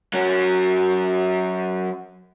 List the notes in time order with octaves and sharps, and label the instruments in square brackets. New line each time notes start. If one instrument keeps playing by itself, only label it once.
[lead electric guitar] F#3 C#4